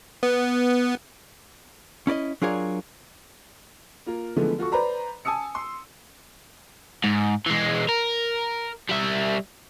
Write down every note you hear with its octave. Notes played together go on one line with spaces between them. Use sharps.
B3
C#4 E4 D5 D#5
F#3 D4 F4 G#4 A#4 C#5
A#3 F4 A#4
D3 E3 F3 G#3 A3 B3
F4 F#4 A4 C#6
B4 C5 D5 A#5 B5
G#5 A5 D#6 E6 C#7
C6
G#2
E3 G#3
A#4
G3 E5